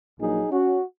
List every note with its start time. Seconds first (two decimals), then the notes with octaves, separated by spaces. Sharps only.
0.19 A#1 A#2 F#3 D#4 G#4
0.51 C#4 F#4